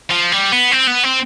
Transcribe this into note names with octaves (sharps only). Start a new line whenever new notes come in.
F3
G3
B3
C4
B3
C4